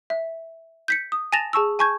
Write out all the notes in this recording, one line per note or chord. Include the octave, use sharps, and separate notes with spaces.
E5
G6 B6 C#7
D#6
G#5 A5 A6 A#6 E7 F7
G#4 A5 C#6 E6
G#5 A5 C#6 G6 G#6